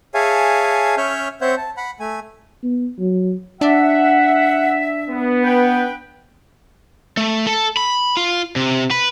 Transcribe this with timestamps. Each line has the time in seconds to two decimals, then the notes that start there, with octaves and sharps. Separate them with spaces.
0.14 G#4 C#5 E5 F5 G#5 A5
0.97 C#4 C#5 E5 F6 G6
1.41 C4 C5 C#5 E5 F#5 G6
1.57 A5
1.77 F#5 B5
2.00 A3 G#5
2.63 B3
2.99 F#3
3.61 D4 E5 F#5
5.10 B3
5.43 B4 G5
7.17 A3
7.47 A4
7.77 B5
8.17 F4
8.56 C3
8.91 B4